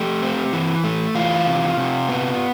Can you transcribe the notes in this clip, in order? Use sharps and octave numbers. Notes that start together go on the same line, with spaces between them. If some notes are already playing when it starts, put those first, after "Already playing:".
Already playing: A3 G4
C4
E3
A3
E3 F4
C3
C3
B3